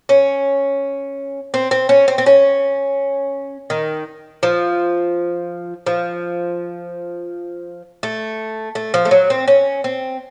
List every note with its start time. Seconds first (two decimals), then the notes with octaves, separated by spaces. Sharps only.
0.09 C#4
1.54 C4
1.71 C4
1.89 C#4
2.08 C4
2.18 C4
2.26 C#4
3.70 D#3
4.43 F3
5.87 F3
8.03 A3
8.75 A3
8.94 F3
9.05 A3
9.11 F#3
9.30 C4
9.48 C#4
9.84 C4